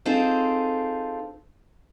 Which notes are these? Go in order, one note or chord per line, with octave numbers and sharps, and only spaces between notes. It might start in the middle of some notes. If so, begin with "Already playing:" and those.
C4 D#4 F4 G#4 A4 C5